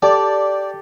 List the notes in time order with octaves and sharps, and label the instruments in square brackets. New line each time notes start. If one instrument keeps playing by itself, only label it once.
[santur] G4 A4 [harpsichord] D5